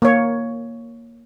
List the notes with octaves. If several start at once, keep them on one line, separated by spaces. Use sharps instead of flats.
A#3 C#5